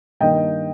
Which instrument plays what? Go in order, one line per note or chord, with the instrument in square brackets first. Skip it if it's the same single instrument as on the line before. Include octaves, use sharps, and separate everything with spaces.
[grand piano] G2 D#3 A#3 D4 D#5 G5